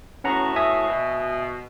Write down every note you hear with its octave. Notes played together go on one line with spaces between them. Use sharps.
A2 B3 C#4 F#4 F#5 A#5
E5 G#5 D#6
B2